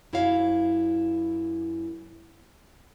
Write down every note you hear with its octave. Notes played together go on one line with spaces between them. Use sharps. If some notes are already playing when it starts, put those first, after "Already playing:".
F#2 E4 F#4 C#5 F5